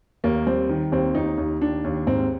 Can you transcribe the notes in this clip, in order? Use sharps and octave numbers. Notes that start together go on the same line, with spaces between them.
D#2 A#3
G3 C4
D#3
D#2 C4
D#2 D#4
D#2
D#3 D4
D#2
G#2 C4